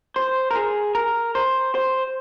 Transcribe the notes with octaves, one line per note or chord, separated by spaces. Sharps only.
C5
A#4
G#4
A#4
C5
C5